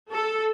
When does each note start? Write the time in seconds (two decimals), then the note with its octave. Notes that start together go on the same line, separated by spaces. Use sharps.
0.12 A4